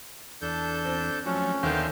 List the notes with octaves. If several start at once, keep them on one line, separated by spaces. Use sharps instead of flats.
E2 D4 A4 G6
C4
F3 F#3 A3 C#4
D#2 D3 D#3 B3 C5 E5 F5 G5